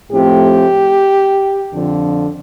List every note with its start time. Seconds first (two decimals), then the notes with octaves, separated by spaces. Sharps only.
0.11 A2 F3 A3 C4 G4
1.72 F2 D3 F3